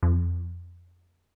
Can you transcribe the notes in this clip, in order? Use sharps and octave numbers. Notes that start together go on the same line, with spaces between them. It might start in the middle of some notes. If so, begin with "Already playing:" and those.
F2